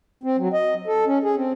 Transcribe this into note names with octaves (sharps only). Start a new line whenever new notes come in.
C4
F#3
D#5
A4
C#4
G#4
C4